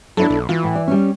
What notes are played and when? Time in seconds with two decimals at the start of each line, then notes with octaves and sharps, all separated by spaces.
0.17 F#3 D4 E4 A4
0.30 B1
0.49 E3 F4
0.63 A2
0.75 D5
0.87 G3 C#4